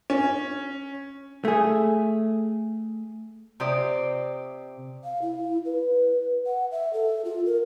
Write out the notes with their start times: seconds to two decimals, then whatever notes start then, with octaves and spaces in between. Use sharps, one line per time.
0.10 C#4
1.45 A3 G#4
3.60 C3 C4 G4 D5 C6 D#6
5.04 F5
5.22 E4
5.65 B4
6.46 F#5
6.71 E5
6.93 A4
7.25 F4
7.46 A#4